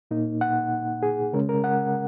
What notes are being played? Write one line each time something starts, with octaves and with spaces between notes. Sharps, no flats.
A#2 A#3 D#4
F#5
G#4
C#3 G#3 C#4 A#4
A#4
F#5